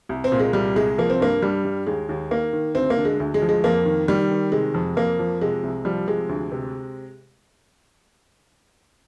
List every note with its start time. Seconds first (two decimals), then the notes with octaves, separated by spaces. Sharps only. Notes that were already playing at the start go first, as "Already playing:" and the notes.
0.09 C2
0.24 C4
0.32 A#2
0.39 G#3
0.53 C2 G3
0.75 C2 G#3
0.98 F3 A#3
1.10 C4
1.20 G2 A#3
1.42 G2 G3
1.64 G2
1.86 D#2 G#3
2.09 D#2
2.31 D#3 A#3
2.53 D#3
2.75 D2 C4
2.90 A#3
2.98 D3
3.05 G#3
3.20 D2
3.34 G#3
3.42 F3
3.49 G#3
3.64 F2 A#3
3.86 D#3
4.08 D#3 G3
4.31 D#3
4.52 C3 G#3
4.74 F2
4.97 F2 A#3
5.19 F3
5.41 C3 G#3
5.63 C2
5.85 F3 G3
6.07 C3 G#3
6.29 D2
6.52 C3